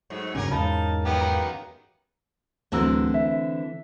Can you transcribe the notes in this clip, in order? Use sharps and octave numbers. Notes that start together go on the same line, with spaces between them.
G#2 F#3 A3
G2 C#3 F#3 C#4 A#4 G#5
E2 G#2 C#3 D#4 A#4 A5 B5
F#2 D#3 A#3 B3 G4
A#5
D1 D3 E3 C4 A#5 E6
E5